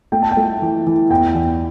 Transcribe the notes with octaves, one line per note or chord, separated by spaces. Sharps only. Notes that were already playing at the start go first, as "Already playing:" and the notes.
A3 G5
A5
G5
A3
E3
E3
E2 G5
E2